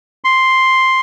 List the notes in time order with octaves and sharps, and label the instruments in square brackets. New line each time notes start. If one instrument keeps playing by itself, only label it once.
[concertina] C6